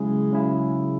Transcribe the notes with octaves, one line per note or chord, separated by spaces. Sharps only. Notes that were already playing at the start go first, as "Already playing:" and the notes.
Already playing: C#3 F#3 G#3 C#4 E4 G#4
C#3 F#3 C#4 E4 G#4